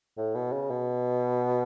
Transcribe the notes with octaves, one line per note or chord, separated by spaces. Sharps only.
A2
B2
C#3
B2